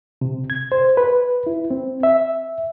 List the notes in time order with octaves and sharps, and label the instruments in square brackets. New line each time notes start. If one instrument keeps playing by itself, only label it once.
[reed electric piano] C3
G#6
C5
B4
E4
C4
E5